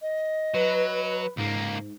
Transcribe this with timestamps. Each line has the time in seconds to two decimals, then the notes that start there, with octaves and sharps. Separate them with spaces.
0.02 D#5
0.54 F#3 B4
1.37 C#2 G#2 A#3